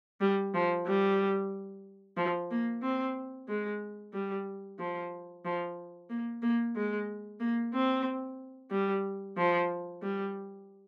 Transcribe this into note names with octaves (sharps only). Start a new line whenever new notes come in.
G3
F3
G3
F3
A#3
C4
G#3
G3
F3
F3
A#3
A#3
G#3
A#3
C4
G3
F3
G3